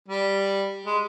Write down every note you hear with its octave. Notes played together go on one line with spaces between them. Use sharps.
G3
G#3